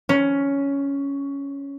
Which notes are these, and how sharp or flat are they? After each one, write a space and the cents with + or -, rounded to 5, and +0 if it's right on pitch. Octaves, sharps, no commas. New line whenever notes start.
C#4 +10